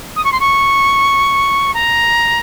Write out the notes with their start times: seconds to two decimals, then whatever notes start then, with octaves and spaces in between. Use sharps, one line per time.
0.16 D#6
0.24 C#6
0.32 C6
0.40 C#6
1.74 A#5